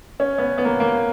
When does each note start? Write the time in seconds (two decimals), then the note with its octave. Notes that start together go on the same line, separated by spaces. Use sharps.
0.20 C#4
0.38 B3
0.58 B3
0.65 A#3
0.80 A#3